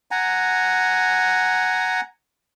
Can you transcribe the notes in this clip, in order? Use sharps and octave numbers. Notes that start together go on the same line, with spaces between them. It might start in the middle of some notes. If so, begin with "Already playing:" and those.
F#5 G#5 A#5